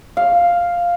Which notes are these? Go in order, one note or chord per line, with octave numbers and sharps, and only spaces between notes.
F5